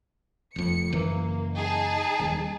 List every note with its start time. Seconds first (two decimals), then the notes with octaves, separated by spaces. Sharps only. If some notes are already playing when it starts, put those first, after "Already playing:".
0.56 F1 F2 C#7
0.93 F#1 E3 A#3
1.54 D#4 G#4 A5
2.19 D#1